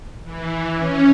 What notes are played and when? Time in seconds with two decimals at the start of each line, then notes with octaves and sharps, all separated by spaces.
0.24 E3
0.75 C#4